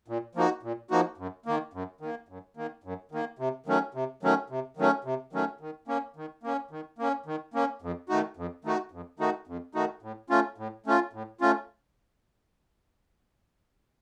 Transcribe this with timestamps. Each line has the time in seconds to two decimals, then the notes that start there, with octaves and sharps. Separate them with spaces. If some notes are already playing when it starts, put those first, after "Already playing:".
0.08 A#2
0.35 F3 A#3 D#4 F#4
0.63 A#2
0.90 F3 A#3 D#4 F#4
1.17 F#2
1.46 D#3 A#3
1.73 F#2
2.01 D#3 A#3
2.28 F#2
2.57 D#3 A#3
2.84 F#2
3.12 D#3 A#3
3.39 C3
3.66 D#3 F#3 A3 C#4
3.94 C3
4.23 D#3 F#3 A3 C#4
4.50 C3
4.77 D#3 F#3 A3 C#4
5.04 C3
5.33 D#3 F#3 A3 C#4
5.61 D#3
5.87 A#3 C#4
6.16 D#3
6.43 A#3 C#4
6.71 D#3
6.98 A#3 C#4
7.26 D#3
7.54 A#3 C#4
7.82 F2
8.09 D#3 A3 D#4 F#4
8.37 F2
8.64 D#3 A3 D#4 F#4
8.91 F2
9.19 D#3 A3 D#4 F#4
9.47 F2
9.75 D#3 A3 D#4 F#4
10.02 A2
10.30 A3 C#4 F4
10.58 A2
10.86 A3 C#4 F4
11.13 A2
11.41 A3 C#4 F4